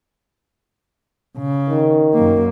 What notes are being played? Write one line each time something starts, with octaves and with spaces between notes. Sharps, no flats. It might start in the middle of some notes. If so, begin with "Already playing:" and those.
C#3
D#3
F#2 A#3